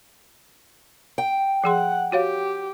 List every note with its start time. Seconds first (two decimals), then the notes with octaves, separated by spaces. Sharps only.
1.18 G5
1.64 F3 G#4 F#5 C6
2.12 F#4 G4 C#5 F5